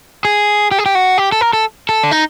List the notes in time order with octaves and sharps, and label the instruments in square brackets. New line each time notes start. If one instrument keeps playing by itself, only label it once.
[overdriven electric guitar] G#4
G4
G#4
G4
F#4
G4
A4
A#4
A4
A4
D4
D#4